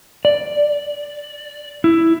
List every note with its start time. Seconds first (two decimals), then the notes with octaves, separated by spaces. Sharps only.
0.25 D5
1.84 E4